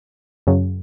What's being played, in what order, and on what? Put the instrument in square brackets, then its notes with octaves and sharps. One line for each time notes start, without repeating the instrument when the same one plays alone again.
[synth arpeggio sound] F#2 C#3 F#3